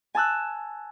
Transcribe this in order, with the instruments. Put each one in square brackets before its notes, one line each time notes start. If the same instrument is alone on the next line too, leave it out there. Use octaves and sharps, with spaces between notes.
[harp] G#5 A5 E6 F#6